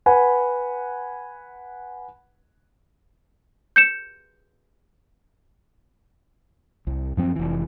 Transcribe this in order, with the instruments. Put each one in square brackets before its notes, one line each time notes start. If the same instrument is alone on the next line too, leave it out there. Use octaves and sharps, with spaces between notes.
[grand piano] B4 F#5 G#5 B5
[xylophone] G6 C#7 E7
[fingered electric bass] C2
F#2 F3 C4
F1 E3